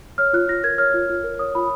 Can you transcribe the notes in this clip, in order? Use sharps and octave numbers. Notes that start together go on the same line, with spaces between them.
C#5 F6
F4 F#6
F4 A#6
A#4 G#6
C#5 F6
F4
F4
A#4
C#5 D#6
F4 B5